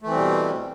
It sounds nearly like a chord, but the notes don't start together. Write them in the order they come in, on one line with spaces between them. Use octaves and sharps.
A3 E3 C4 G3 B2